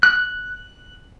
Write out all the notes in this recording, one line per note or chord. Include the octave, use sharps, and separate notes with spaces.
F#6